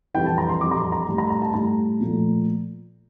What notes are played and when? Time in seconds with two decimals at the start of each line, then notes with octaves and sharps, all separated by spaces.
0.14 F2 E3 G3 G5
0.26 A5
0.38 A#5
0.49 C6
0.61 F2 E3 G3 D6
0.71 A#5
0.77 C6
0.92 A#5
1.07 A2 G3
1.18 A#5
1.30 A#5
1.42 A5
1.53 A2 G3 A#5
2.00 A#2 F3 A3